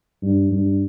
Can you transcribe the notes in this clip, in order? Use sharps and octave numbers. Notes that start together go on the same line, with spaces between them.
G2
G2